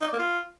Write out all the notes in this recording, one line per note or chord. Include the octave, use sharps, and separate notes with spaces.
D#4
D5
A#3
F4